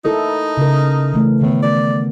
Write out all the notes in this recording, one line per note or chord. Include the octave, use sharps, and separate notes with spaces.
D#4 E4 A4 A#4
C#3 A#4
E3 A3
A2 D#3 B3
D5